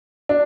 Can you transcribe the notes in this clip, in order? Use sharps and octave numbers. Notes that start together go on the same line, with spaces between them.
D4